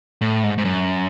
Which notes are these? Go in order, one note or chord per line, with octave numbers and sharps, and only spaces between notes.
A2
G#2
G#2
F#2